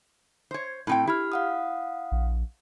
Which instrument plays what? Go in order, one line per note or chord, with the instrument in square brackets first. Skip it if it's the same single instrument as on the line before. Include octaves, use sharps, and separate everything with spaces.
[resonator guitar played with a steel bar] C5 C#5
A2 C4 G5
[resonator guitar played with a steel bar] E4 [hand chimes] G4 F6
[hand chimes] F5 F#5 D#6
[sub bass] A#1